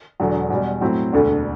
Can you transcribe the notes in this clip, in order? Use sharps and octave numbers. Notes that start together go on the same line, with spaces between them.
E1 E2 D3 F#3
E2 B2 G3
A2 F#3 C4 E4
E1 D2 D3 A3 D4